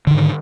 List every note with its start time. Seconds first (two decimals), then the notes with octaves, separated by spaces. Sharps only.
0.07 D3
0.11 D#3
0.14 G#2